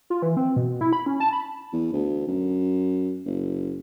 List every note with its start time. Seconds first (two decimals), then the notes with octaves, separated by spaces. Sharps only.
0.10 F4
0.22 E3
0.37 C4
0.56 B2
0.81 E4
0.93 B5
1.06 C#4
1.20 A5
1.33 B5
1.73 E2
1.93 D2
2.27 F#2
3.25 F#1